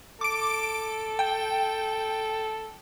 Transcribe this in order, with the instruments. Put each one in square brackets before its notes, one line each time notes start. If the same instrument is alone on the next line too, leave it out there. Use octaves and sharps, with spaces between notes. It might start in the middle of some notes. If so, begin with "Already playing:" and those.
[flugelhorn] A4 [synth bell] D6 D7
[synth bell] G5